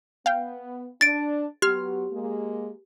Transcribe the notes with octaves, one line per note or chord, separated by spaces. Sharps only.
B3 F5 G5
D4 A6 D7
F#3 B3 G4 F6
G#3 A#3